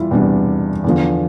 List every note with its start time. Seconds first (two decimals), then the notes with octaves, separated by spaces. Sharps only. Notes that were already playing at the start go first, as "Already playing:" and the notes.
Already playing: E2 G3 E4 F4
0.11 E2 C3 G3 D4
0.84 E2 D3 F3